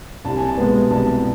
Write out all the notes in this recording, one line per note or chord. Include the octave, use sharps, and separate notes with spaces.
C2 A5
G#5
A5
B2 G#3 B3
C2 A5